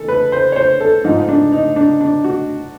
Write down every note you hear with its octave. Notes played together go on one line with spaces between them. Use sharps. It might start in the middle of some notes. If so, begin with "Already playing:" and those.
Already playing: E3 A4
B4
C5
C#5
C5
A4
G#2 F3 D#4
D4
D#4
D4
D4
F#4